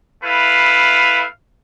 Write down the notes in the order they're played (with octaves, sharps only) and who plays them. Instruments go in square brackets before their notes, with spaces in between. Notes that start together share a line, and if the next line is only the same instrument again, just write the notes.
[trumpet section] A3 E4 B4 F5